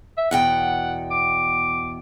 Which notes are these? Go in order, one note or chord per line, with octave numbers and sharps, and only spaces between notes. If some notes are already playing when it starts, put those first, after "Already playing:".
E5
E2 B2 F#5 G5
D6